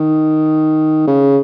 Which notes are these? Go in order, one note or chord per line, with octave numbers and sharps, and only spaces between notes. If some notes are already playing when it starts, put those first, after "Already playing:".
Already playing: D#3
C#3